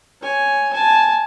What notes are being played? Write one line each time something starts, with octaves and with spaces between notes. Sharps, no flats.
C#5 G#5
G#5 A5